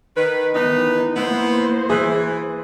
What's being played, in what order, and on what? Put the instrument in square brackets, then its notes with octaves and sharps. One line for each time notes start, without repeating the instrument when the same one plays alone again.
[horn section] D#3 B4
[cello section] D#3 B3 [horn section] E3 D#4 B4
[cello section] A#3 C5 [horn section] B3 E4
[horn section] E3 [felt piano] G#4